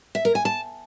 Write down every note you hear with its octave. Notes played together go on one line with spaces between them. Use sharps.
E5
A#4
G#5
A5